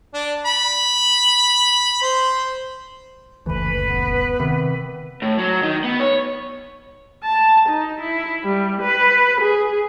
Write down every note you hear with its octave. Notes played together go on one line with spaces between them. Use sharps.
D4
B5
C5
F#1 D2 E3 B4
D#1 B3
C3 D#3
A2
F#3
D#3
B3
C#5
A5
D#4
E4
G3
B4
G#4